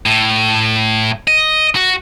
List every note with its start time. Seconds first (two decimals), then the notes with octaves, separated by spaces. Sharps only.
0.06 A2
1.27 D#5
1.75 F#4